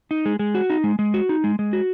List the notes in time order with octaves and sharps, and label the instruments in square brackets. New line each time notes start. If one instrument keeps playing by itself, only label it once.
[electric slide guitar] D#4
G#3
G#3
F#4
D#4
G#3
G#3
F#4
D#4
G#3
G#3
F#4